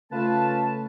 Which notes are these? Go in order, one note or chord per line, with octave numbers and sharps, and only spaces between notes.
C#3 A3 F4 B4 A5